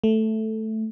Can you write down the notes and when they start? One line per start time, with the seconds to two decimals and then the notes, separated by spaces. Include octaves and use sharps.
0.04 A3